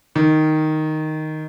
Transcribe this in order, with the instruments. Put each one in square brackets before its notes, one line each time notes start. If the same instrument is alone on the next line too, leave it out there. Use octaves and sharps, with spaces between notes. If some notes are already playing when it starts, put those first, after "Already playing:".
[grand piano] D#3